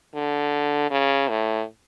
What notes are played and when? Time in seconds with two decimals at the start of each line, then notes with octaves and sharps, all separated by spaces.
0.15 D3
0.91 C#3
1.30 A2